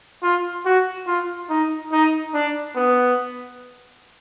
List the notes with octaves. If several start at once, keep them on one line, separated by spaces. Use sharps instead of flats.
F4
F#4
F4
D#4
D#4
D4
B3